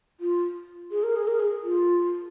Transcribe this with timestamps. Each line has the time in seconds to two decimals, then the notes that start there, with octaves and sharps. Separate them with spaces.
0.20 F4
0.91 G#4
1.03 A#4
1.16 G#4
1.28 A#4
1.39 G#4
1.63 F4